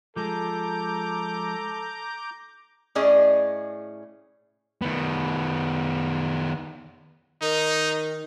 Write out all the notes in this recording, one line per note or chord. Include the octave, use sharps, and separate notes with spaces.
F3 G#3 A4 A#5 D6 G6
A2 C#4 G#4 D5 D#5
D#3 B3
D#3 D#4